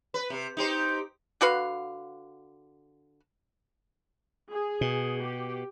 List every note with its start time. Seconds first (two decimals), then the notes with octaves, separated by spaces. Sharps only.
0.14 B4
0.30 C3
0.57 D#4 G4 C5
1.41 D3 F#4 B4 F5
4.52 G#4
4.81 B2
5.22 G4